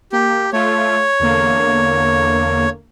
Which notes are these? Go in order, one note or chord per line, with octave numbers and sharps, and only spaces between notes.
A#3 G4
A3 F4 C#5
E2 D3 A#3